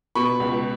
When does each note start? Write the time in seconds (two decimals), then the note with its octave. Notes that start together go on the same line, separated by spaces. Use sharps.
0.15 B2 B5 C#6
0.40 C#2